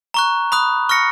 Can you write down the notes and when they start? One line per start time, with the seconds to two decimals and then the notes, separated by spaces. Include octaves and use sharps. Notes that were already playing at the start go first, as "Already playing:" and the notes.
0.14 A#5 C#6 F#6
0.52 B5 D#6 F#6
0.89 C#6 F6 A#6 C#7